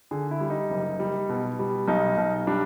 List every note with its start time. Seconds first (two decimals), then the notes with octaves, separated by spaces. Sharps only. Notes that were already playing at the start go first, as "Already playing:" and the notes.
0.11 D3 G#4
0.31 E4
0.40 G3
0.50 D#4
0.70 F#1
1.00 G3
1.29 B2
1.59 G3
1.88 B1 D#4
2.18 B1
2.47 G3 D4